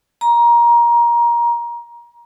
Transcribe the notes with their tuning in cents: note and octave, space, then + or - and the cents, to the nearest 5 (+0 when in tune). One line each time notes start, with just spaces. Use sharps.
A#5 +20